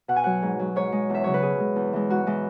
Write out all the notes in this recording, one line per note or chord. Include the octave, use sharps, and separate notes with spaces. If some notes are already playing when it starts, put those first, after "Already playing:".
B2 F#5
G#5
F#3 F#5
G#2
F#3
G#2 C#5
G#3
E2 E5
C#3 F#3 C#5
B4
B2 G#4
G#3
E2
E3 G#3
G#2 F#4
E3 G#3